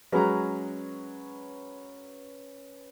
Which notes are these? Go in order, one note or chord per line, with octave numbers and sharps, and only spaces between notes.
F#3 G#3 C#4 B4 A#5